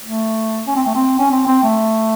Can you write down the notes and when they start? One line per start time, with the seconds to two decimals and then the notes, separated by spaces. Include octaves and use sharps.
0.03 A3
0.67 C#4
0.76 C4
0.86 A3
0.95 C4
1.19 C#4
1.31 C4
1.47 C4
1.63 A3